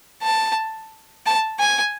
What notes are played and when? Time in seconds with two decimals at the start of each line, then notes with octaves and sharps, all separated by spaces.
0.23 A5
1.26 A5
1.60 G#5